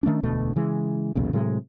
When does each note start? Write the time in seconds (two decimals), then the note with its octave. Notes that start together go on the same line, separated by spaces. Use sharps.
0.03 D#3 A3 C#4 D4
0.23 E1 D2 B2 A3
0.56 C#3 E3 G#3
1.15 B1 E2 A#2 C#3
1.33 A2 C3 F#3 G#3